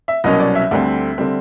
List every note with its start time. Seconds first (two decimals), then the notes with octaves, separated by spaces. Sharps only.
0.08 E5
0.24 C2 B2 F#3 A#3 C#4 D#5
0.40 D5
0.55 E5
0.71 D2 D3 G3 C4
1.18 D3 G3 C4